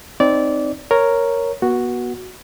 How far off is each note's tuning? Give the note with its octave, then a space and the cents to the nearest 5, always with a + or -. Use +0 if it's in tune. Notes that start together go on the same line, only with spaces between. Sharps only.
C4 +0 D#4 +0 D5 -20
A#4 +0 C#5 +0
B3 -35 F#4 +0